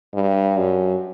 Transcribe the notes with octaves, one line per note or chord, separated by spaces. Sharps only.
G2
F#2